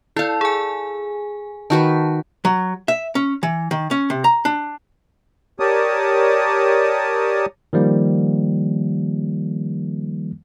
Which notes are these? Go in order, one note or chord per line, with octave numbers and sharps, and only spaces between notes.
E4 A4 D5 F5
G#4 G#5
D#3 F#4 B4 A5
F#3
E5
C#4
E3
D#3
C#4
C3
A#5
D4
G4 A#4 C#5 D5 A5 D#6
D#3 F3 G3 A#3